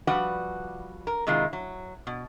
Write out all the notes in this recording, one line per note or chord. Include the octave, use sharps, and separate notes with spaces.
F3 G3 F#4 B4 F#5
A#4
C3 D#3 G#3 E4 F4
F#3
B2